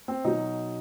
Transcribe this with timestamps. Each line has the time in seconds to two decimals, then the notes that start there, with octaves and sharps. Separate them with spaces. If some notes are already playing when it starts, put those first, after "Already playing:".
0.08 C4
0.24 B2 F#3 D#4